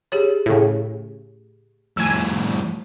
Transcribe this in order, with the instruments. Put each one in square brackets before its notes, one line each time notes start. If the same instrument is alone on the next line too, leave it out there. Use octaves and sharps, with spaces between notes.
[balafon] G4 G#4 C#5
[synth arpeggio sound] A2 C#3
[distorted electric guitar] F2 A2 [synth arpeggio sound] G#5 E6